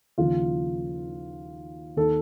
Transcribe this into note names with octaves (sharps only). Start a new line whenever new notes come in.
D#2 C#3 F3 F4
D#2 D#3 A4